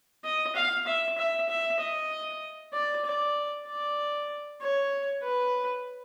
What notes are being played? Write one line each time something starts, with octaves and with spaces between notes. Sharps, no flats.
D#5
F5
E5
E5
E5
D#5
D5
D5
D5
C#5
B4